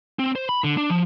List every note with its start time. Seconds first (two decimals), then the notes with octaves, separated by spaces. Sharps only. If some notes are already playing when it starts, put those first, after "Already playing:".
0.19 C4
0.36 C5
0.49 B5
0.64 D3
0.77 D4
0.90 F3